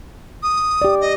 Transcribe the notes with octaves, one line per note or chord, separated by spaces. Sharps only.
D#6
G4 D5
D#5